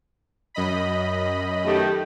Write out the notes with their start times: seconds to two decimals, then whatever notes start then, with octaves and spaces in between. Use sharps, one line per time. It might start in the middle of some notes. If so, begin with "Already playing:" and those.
0.54 F#2 D#5 B5
1.65 D#3 A3 G4